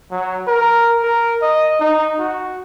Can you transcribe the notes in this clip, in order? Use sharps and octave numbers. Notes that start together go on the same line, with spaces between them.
F#3
A#4
A#4
D#5
D#4
F#4